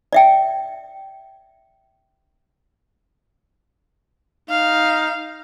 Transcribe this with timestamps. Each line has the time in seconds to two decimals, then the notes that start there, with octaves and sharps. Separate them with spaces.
0.13 D5 E5 G5
4.50 D#4 F5